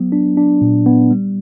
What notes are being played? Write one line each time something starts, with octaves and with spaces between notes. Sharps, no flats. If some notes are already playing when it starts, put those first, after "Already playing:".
Already playing: F#3 B3
D4
D4
A#2
B3
G3